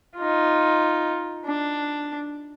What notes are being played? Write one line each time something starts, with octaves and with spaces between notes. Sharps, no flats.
D#4 F4
D4